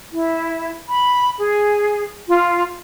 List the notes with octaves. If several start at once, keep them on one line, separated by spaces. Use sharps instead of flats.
E4
B5
G#4
F4